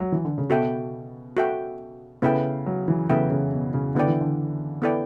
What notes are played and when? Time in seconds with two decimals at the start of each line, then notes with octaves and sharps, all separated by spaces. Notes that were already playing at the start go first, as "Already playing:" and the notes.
0.00 F#3
0.12 E3
0.25 D3
0.38 C#3
0.50 B2 F#4 A4 E5 G5
1.37 F#4 A4 E5 G5
2.22 C#3 B3 E4 A4 E5 G5
2.66 F#3
2.88 E3
3.09 C#3 B3 E4 A4 E5 G5
3.30 C#3
3.53 B2
3.74 C#3
3.95 D3 B3 E4 A4 D5 G5
4.08 E3
4.21 D3
4.82 B3 E4 A4 D5 G5